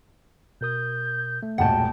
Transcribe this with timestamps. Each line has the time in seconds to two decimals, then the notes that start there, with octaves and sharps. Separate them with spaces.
0.61 B2 A#4 D#6 G6
1.43 A3
1.58 E1 B1 A#2 F#5 G5 A5